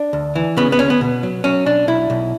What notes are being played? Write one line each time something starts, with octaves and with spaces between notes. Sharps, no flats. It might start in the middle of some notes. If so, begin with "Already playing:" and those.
Already playing: D4
D2
E3
C#3 B3
B3
D2 C#4
B3
B2
F#3
F#3 C#4
B1 D4
B1 E4
B1